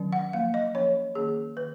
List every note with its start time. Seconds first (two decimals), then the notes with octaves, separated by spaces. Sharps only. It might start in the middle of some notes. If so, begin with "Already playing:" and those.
Already playing: D#3 F#3 C#4
0.13 F#5
0.33 F3 A#3 C#4 F5
0.54 D#5
0.75 F3 A#3 C#4 C#5
1.15 D#3 A#3 C#4 G#4
1.57 D#3 B4